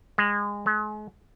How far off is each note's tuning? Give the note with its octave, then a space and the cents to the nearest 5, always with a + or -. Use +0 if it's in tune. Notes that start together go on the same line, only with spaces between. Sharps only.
G#3 -20
G#3 +40